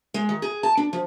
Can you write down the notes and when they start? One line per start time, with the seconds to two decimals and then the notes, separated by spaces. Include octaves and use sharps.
0.14 G#3
0.29 D#3
0.42 G#4
0.63 A5
0.77 D4
0.93 F3